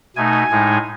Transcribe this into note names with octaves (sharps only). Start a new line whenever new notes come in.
B2 A3 D#4 G#5
A2 G#3 D#4